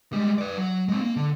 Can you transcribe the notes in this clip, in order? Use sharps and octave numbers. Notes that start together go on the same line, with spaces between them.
G3 G#3
B4 D5
F#3
G#3 C4
A#3
D3